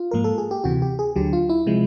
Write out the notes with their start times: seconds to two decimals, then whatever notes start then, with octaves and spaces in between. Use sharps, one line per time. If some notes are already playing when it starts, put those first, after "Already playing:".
Already playing: F4
0.11 G#2 F3 A#3 A#4
0.24 A4
0.38 G#4
0.51 G4
0.64 D2 C3 E3 F#4
0.82 G4
0.99 G#4
1.16 D2 D3 F#3 G4
1.33 F4
1.49 E4
1.66 C3 F3 G#3